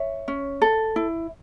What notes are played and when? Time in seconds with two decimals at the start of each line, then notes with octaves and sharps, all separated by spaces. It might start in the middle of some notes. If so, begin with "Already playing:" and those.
Already playing: C#5 E5
0.28 C#4
0.62 A4
0.96 E4